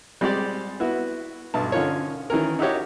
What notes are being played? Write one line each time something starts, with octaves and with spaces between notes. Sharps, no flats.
G3 G#3 C4 G4 D5
B3 E4 F#4
B1 G2 A5
D3 C#4 D#4 F4 A#4 C#5
D#3 E3 C#4 A#4
D#4 E4 F#4 G4 C#5